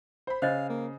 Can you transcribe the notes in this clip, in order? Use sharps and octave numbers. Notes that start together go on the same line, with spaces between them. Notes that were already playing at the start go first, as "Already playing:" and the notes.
C5 B5
C#3 C5 C#5 D#5 F5
A#3